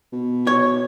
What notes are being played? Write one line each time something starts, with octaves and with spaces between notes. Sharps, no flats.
B2
C#5